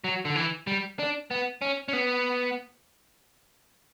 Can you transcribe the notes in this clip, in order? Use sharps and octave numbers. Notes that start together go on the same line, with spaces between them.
F#3
D3
E3
G3
D4
B3
C#4
C#4
B3